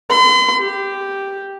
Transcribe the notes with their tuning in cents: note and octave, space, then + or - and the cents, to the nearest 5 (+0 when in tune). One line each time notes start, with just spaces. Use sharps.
C6 -45
G4 +0